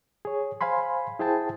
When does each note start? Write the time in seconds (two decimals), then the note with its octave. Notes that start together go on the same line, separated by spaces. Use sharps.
0.25 G#4 C#5
0.61 C5 F5 G#5 B5 C6
1.19 E4 G#4 C5 G5 A5